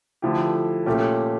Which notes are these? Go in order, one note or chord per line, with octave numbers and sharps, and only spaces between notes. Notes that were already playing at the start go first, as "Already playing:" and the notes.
D3 F3 A3 E4 G4
A#2 A3 C#4 G4